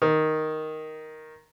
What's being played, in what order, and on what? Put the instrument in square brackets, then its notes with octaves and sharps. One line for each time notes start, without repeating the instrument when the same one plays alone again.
[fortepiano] D#3